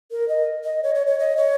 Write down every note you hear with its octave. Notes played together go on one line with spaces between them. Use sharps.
A#4
D#5
D#5
C#5
C#5
C#5
D#5
C#5